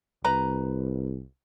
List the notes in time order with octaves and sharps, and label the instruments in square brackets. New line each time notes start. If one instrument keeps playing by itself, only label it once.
[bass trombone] C2 [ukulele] B4 A#5